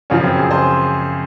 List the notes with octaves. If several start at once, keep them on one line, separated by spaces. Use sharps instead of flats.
F#2 C#3 F3 C#4
C4
G#4
C5